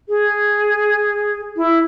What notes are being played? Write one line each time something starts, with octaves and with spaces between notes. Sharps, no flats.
G#4
E4